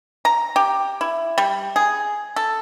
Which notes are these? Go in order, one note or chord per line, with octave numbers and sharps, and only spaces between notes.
A#5
G4
E4
G3
G#4
A4